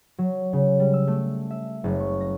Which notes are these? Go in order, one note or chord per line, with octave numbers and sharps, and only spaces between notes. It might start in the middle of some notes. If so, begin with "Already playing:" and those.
F#3
C#3
G3
E6
A3
E5
F#1
C#6
A#6